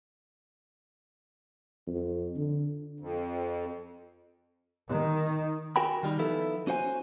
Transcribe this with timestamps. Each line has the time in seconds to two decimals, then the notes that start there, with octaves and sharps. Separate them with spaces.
1.87 F2
2.36 D3
3.00 F2
4.89 D#3
5.76 F#4 A#4 G5 G#5 B5
6.03 D#3 G3 D#4
6.19 F3 B3 D#4 E4 A4
6.67 C#4 F#4 C5 F#5 G#5